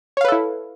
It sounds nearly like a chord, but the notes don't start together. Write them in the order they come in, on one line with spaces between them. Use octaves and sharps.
C#5 F5 B4 A4 E4